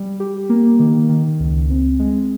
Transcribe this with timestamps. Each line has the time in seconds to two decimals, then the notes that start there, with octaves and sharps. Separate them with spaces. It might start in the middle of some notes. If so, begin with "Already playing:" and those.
Already playing: G3
0.20 G4
0.49 A#3
0.79 D#3
1.09 D#3
1.40 C#2
1.69 C4
1.99 G#3